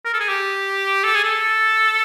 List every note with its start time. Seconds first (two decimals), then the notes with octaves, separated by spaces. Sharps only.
0.05 A#4
0.13 A4
0.20 G#4
0.29 G4
1.04 A4
1.15 G#4
1.24 A4